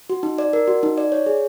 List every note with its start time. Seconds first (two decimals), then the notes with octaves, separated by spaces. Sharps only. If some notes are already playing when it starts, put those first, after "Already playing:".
0.10 F#4
0.23 D#4
0.38 D5
0.53 A#4
0.68 F#4
0.83 D#4
0.98 D5
1.12 C#5
1.26 G#4